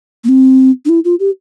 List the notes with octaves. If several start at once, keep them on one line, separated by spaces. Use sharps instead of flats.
A#3
C4
D4
E4
F4
G4